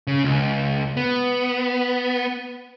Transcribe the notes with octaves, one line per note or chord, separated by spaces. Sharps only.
C#3
C#2
B3